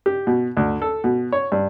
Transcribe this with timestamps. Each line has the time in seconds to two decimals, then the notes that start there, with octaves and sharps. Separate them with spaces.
0.06 G4
0.27 B2
0.57 D2
0.82 A4
1.04 B2
1.32 C#5
1.52 G2